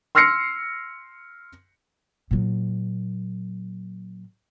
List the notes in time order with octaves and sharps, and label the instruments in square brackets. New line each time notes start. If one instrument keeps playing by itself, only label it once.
[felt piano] C6 E6 F6 A#6 C7 C#7
[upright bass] A#2 F#3